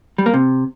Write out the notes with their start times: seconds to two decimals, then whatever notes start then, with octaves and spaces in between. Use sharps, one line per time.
0.18 G3
0.26 A#3
0.34 C3